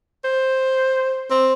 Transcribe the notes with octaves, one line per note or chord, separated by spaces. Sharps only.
C5
C4